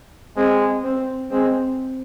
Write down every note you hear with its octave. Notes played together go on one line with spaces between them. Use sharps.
G#3 C4
C4
G#3 C4